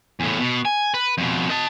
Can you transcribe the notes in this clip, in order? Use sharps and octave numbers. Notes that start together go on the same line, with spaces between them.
E2 A2
B2
G#5
B4
F2 B2
D#5 A5